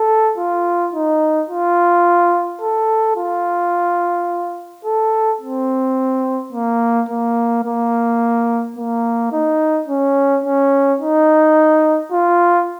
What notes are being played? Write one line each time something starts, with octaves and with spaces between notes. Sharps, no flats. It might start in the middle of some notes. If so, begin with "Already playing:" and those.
Already playing: A4
F4
D#4
F4
A4
F4
A4
C4
A#3
A#3
A#3
A#3
D#4
C#4
C#4
D#4
F4